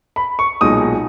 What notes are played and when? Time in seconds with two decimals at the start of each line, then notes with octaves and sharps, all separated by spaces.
0.16 B5
0.39 C#6
0.61 B1 A#2 G#3 D#4 D#6